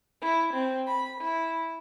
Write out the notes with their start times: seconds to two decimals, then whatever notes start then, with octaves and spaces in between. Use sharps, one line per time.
0.21 E4
0.53 C4
0.87 B5
1.20 E4